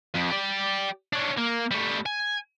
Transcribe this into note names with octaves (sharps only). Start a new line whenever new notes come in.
F2
G4 D5
C#4 D4
A#3
G3 A3
G#5